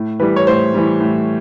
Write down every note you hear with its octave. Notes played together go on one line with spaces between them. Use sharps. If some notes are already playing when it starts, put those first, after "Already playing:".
Already playing: A2
E3 G3 B4
C#5
A2 C5
E3 G3
A2